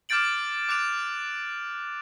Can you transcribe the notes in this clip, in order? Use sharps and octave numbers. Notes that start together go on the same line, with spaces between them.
D6 F6 G6 A6 D7 F#7
D6 F#6 D7 F7